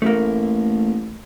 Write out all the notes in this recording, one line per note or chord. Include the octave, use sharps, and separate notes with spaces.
A1 A3 A#3